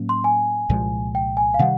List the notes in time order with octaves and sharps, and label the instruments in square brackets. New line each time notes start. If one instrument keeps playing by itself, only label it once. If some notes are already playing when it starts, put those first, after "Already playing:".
Already playing: [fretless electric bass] A2 F#3 A#3 C#4
[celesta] C6
G#5
[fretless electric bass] C2 A#2 F3 G#3
[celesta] G5
G#5
F5
[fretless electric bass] C3 D#3 G3 [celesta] F#5